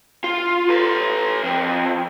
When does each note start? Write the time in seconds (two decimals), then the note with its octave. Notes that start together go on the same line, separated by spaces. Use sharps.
0.24 F4
0.69 A4 B4
1.43 F2